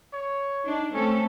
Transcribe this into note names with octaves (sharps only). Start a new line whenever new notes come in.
C#5
D4 D#4
A3 C4 C#4 A4